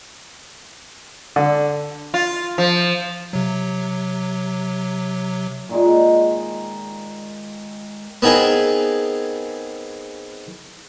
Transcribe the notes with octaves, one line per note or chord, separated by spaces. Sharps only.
D3
F4
F3
C3 F#3
A#2 D#3 G#3
B3 C4 D#4 G#4 A#4 B4